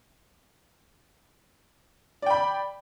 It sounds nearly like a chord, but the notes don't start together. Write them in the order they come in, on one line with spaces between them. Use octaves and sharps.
D5 G5 B5